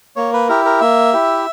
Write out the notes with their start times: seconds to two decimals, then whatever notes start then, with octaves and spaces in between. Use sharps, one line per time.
0.16 A#3 C#5
0.33 B4
0.49 E4 G4 A#4
0.65 A#4
0.81 A#3 E5
1.13 E4 G4